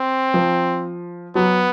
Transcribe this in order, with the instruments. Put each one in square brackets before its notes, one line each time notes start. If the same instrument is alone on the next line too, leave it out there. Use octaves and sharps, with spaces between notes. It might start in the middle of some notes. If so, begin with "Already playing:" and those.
Already playing: [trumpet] C4
[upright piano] F3
[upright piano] F#3 [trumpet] B3